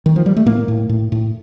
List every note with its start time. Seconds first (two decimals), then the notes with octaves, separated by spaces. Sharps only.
0.06 D#3
0.16 F3
0.26 G3
0.36 A3
0.46 A2 A#3
0.68 A2
0.89 A2
1.12 A2